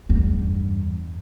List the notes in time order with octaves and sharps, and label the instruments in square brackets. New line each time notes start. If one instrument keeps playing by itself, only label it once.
[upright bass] E2 G2